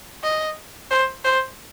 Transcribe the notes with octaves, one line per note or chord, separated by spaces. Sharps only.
D#5
C5
C5